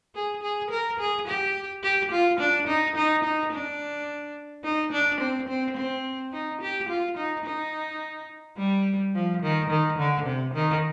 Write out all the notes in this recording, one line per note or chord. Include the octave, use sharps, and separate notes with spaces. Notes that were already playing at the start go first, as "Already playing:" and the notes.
G#4
G#4
A#4
G#4
G4
G4
F4
D4
D#4
D#4
D#4
D4
D#4
D4
C4
C4
C4
D#4
G4
F4
D#4
D#4
G3
F3
D#3
D#3
D3
C3
D#3